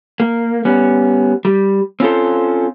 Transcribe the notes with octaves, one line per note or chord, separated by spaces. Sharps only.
A#3
G3 B3 C#4
G3
C4 C#4 F4 A4 C5